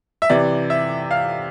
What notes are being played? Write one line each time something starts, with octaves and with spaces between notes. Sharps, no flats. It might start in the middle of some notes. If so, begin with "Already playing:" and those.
E5
C3 E3 D5
E5
F5